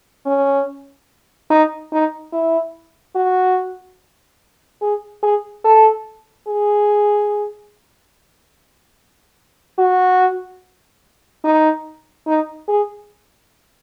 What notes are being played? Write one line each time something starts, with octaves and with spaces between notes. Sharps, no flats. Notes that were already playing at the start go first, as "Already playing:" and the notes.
C#4
D#4
D#4
E4
F#4
G#4
G#4
A4
G#4
F#4
D#4
D#4
G#4